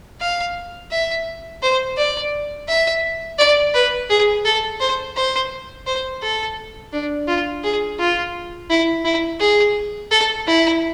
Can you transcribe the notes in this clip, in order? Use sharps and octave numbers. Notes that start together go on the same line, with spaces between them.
F5
E5
C5
D5
E5
D5
B4
G#4
A4
C5
C5
C5
A4
D4
F4
G#4
F4
E4
E4
G#4
A4
E4